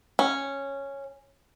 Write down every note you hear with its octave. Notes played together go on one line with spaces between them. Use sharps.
C#4